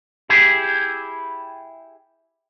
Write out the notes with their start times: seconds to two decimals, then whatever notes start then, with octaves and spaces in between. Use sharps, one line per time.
0.29 E4 G4 G#4